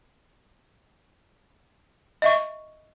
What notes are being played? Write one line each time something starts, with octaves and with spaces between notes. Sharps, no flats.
D#5 E5 C#6